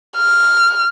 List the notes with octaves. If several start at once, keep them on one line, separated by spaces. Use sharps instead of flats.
F6